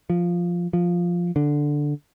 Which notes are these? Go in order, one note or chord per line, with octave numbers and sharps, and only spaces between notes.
F3
F3
D3